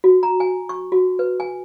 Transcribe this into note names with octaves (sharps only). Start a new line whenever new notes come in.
F#4
A#5
G#5
C#6
F#4
B4
G#5